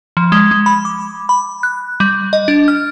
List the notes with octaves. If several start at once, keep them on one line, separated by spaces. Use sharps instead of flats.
F3
G#3
G#3
B5
D6
B5
F#6
G3
D#5
D4
F6